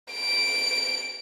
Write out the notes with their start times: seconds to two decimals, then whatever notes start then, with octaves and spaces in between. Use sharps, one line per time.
0.12 D7